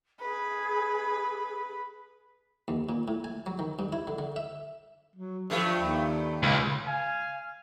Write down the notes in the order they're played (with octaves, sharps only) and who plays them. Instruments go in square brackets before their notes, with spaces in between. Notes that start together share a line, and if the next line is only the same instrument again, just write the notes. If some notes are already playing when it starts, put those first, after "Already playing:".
[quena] G#4 [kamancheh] B4
[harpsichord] D#2
A#2
A2
G#5
F#3
D#3
G2
E4
D3
D3
E5
[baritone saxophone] F#3
[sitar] G2 A3 [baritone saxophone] F3
[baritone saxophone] D#2
[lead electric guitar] C#2
[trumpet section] F5 G#5